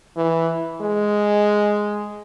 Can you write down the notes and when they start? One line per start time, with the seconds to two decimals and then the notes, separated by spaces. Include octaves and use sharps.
0.16 E3
0.81 G#3